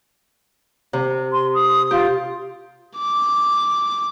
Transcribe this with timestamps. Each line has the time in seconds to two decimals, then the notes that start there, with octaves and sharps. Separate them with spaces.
0.93 C3
1.32 C6
1.54 D#6
1.91 F4 G4
2.98 D6